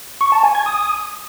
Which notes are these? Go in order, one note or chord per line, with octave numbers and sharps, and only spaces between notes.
C#6
A5
G#5
G#6
D#6